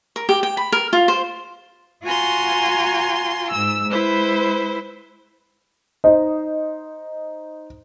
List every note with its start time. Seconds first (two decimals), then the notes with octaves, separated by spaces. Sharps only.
0.16 A#4
0.29 G4
0.43 G5
0.57 B5
0.72 A#4
0.93 F4
1.08 C5
2.04 F4 F#4 G#5 A#5 C6
3.52 G#2 E6
3.90 G#3 E4 B4 C5
6.04 D#4 C5 D#5